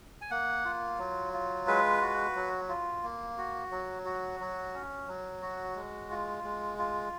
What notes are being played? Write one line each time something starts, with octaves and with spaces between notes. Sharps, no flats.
G#5
A#3 F#5
F4
F#3
F4
G#3 B4
F#4
F#3
F4
A#3
F#4
F#3
F#4
F#3
C#4
F#3
F#4
G#3
F4
G#3
F4